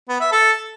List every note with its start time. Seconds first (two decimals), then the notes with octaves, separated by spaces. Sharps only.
0.09 B3
0.20 E5
0.32 A4